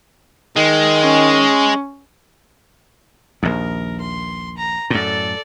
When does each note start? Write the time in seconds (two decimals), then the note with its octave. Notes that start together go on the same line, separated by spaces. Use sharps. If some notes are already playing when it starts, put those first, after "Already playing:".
0.56 D#3 G#3
1.03 C#4
3.43 A#1 D#2 A#4
4.00 C6
4.57 A#5
4.90 F#2 A2 A4 D5